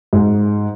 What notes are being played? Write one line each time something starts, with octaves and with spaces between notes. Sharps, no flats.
G#2